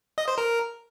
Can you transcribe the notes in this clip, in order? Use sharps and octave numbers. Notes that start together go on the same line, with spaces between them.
D#5
C5
A#4